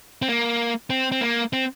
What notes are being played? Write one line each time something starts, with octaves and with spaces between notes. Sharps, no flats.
C4
A#3
C4
C4
A#3
C4